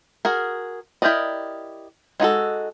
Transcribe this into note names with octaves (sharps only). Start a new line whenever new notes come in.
F#4 G#4 A#4
E4 G4 A#4 D5 D#5
G#3 D#4 F#4 A4